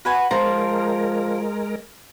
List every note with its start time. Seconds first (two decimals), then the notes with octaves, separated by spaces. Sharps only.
0.05 F#4 B4 G#5
0.31 F3 G#3 A#4 A#5